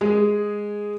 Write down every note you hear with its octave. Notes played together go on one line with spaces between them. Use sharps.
G#3 G#4